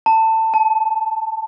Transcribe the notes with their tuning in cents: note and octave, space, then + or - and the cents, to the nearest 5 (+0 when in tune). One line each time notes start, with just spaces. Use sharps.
A5 +20
A5 -15